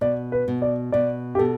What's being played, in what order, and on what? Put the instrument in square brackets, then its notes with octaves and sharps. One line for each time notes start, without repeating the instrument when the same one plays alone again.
[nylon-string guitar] B2 [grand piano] D5
[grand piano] B4
[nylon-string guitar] B2
[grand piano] D5
[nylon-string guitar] B2 [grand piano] D5
[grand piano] G4
[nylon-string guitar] B2 [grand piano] A4